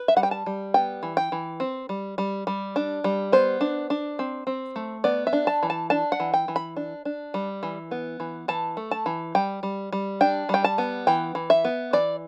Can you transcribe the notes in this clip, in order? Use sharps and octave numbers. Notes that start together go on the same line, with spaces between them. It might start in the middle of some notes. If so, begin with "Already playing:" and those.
Already playing: B4
E5
G3 F#5
G5
A5
G3
B3 G5
E3
G5
E3
C4
G3
G3
G3
D4
G3
B3 C5
D4
D4
C4
C4
A3
B3 D5
E5
D4
A5
E3
A5
D4 A5
F#5
E3
G5
E3
B5
D4
D4
G3
E3
B3
E3
E3 A5
A3
A5
E3
G3 G5
G3
G3
D4 G5
G3 G5
A5
B3
E3 G5
E3
E5
B3
E3 D5